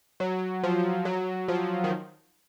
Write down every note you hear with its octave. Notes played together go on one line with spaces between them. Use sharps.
F#3
F3
F#3
F3
D#3